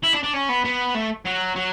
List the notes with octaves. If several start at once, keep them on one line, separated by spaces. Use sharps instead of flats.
E4
D4
D4
C#4
B3
B3
A3
F#3
F#3